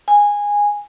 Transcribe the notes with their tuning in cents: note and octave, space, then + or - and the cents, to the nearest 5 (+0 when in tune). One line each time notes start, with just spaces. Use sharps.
G#5 -15